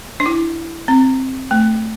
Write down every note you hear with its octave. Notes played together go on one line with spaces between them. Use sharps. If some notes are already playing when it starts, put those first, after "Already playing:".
D4
E4
C4
A3